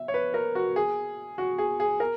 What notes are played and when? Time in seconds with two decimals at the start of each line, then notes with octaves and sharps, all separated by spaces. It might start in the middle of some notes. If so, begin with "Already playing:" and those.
Already playing: E5
0.08 C#5
0.14 B4
0.34 A#4
0.55 F#4
0.76 G#4
1.38 F#4
1.58 G#4
1.80 G#4
2.00 A#4